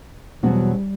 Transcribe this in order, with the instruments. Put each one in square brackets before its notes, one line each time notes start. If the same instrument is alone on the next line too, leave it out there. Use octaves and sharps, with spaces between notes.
[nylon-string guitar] E2 B2 F#3 C4 F#4 [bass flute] G3